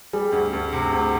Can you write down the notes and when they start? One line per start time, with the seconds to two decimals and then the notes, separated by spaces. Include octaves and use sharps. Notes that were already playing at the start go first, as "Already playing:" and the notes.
0.13 G3 G#4
0.32 D2
0.53 D2
0.72 C3
0.91 D2